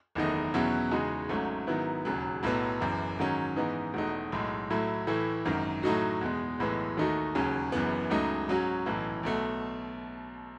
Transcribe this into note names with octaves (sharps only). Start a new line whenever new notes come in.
F#1 E2 D#3 A3 D#4
E2 B2 F#3 C#4 E4
E2 C#3 G#3 D#4 F#4
G#1 G#2 F#3 A3 C#4
G#2 D#3 F#3 B3 E4
E1 D#2 C#3 F#3
B1 A2 F#3 B3
F#1 F#2 E3
G#2 D#3 F#3 C#4
G#2 E3 B3 D#4
E1 E2 B2 A3 D#4
B1 A2 G#3
A2 F#3 A3 E4
A2 E3 A3 E4
G#1 F#2 D#3
A2 F#3 A3 D#4 F#4
E2 B2 G#3
B1 A2 E3 G#3 B3
D#2 D#3 A3 D#4 F#4
E1 D#2 C#3 F#3 C#4
F#1 F#2 E3 B3
C#2 C#3 F#3 A3 D#4
G#2 F#3 C#4 F#4
B1 A2 E3
B1 B2 A3